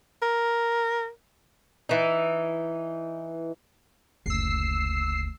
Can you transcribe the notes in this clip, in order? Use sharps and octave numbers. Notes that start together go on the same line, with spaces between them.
A#4
E3 D#4
F#1 D2 E6 C7